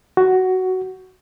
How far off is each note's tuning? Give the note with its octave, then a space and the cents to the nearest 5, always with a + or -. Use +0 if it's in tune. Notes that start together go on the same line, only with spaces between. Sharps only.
F#4 +10